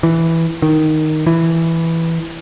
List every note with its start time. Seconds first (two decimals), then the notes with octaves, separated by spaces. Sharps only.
0.03 E3
0.62 D#3
1.27 E3